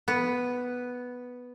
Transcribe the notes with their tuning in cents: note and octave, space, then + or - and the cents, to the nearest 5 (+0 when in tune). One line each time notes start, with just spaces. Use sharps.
B3 +0